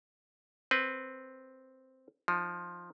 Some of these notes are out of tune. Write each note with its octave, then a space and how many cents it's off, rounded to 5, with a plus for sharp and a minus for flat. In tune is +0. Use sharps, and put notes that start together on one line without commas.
C4 +0 B4 +0
F3 +5 D#4 +0